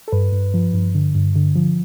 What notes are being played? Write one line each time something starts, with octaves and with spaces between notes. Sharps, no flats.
A4
G2 B4
G2
F3
G2
D3
G2
D3
F3